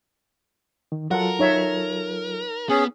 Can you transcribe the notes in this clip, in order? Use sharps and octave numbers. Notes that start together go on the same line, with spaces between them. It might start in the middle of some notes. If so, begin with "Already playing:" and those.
D#3
F#3 F4 A4 A#4 F#5
D#4 C#5 E5
B3 C#4 G#4